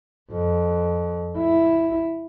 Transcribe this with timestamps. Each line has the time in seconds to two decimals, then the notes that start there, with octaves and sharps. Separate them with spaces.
0.31 F2
1.37 E4